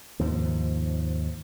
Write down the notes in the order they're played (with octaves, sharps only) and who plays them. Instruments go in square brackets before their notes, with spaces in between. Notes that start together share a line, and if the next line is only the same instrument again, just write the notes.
[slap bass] D#2 G#2 F3